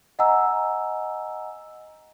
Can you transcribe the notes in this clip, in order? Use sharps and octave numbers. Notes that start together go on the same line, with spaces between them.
D#5 F#5 G#5 A#5 E6